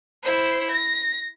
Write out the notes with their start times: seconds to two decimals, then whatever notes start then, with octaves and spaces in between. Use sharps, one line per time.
0.23 E4 C5
0.71 A#6